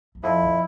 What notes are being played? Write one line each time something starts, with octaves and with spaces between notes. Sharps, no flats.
E2
F2 E4
C#3